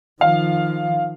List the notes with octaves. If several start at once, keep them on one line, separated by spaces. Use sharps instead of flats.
D#3 F3 F5